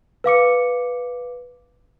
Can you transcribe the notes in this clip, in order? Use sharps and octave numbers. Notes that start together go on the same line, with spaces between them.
B4 F5 D6 C#7